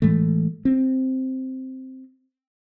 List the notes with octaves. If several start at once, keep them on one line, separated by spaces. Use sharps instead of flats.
A2 E3 G#3 A3
C4